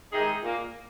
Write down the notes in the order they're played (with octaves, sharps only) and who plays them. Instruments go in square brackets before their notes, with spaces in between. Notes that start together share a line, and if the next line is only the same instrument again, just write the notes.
[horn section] C3 D#3 G#3 D#4 G#4
A#2 A#3